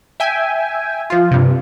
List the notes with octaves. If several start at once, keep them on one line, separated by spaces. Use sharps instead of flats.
E5 G5 G#5
F3 F4
G2 C3